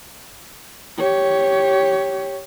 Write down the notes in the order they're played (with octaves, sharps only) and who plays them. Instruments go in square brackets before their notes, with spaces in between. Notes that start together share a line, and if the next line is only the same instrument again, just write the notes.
[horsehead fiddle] G4 C#5